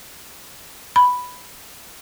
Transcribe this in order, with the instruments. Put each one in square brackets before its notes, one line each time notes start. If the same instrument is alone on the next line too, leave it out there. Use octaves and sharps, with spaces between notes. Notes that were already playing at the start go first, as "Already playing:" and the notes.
[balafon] B5